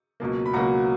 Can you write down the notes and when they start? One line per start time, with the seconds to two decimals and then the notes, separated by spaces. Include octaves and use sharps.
0.20 C#2 B2 F#3 A#3
0.46 B5
0.53 C#2 B2 F#3 A#3 F#5 A#5